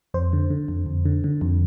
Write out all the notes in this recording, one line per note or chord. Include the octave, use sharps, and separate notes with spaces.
F2 C5
D3
D3
F2
F2
D3
D3
F2